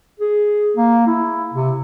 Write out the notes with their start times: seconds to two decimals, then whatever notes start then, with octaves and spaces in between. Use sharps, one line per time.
0.20 G#4
0.77 A#3
1.07 E4
1.54 C3